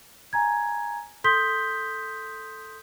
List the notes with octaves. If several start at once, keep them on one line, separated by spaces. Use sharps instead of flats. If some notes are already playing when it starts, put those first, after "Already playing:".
G#5 A#5 G#6
A4 C6 D#6 G6 B6 G7